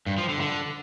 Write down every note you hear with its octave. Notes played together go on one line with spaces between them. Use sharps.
G2
F3
D3
D3